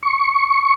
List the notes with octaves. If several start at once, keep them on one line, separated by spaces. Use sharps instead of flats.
C#6